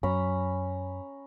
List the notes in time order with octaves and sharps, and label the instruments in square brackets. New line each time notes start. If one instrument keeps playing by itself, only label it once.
[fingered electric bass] F#2 F#3 [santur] C#4 A#5 B5